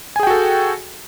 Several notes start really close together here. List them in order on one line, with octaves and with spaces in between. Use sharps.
G#5 G#4 G5 F#4 A4